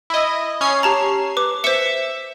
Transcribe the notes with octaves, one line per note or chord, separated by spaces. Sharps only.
E4 D#5
C#4 G#6 C7
G4 A5 A#5
B4 D6
C5 E5 C#7